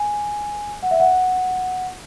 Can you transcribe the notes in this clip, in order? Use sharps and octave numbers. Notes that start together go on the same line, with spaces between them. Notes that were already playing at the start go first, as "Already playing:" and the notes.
Already playing: G#5
F#5
E5
F#5